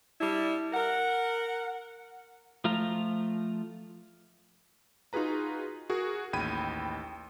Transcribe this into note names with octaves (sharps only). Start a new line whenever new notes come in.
G3 D4 E4
A#4 F#5
F3 A3 F4 A#5
D#4 F4 F#4 G#4 B4 A#5
F#4 G#4 A#4
A1 D#2 G5 B5 G#6 D#7